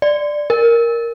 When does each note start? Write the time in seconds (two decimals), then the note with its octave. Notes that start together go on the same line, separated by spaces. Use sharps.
0.02 D5
0.50 A#4